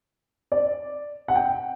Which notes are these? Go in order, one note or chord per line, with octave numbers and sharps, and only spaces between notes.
D5
F#5
G5